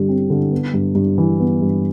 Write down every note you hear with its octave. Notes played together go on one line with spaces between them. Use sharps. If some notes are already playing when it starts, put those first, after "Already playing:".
Already playing: G2 D3 G3
C4
D3
B3
G2
G2
E3
B3
G2